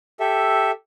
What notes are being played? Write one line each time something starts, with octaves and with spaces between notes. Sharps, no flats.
G4 A4 E5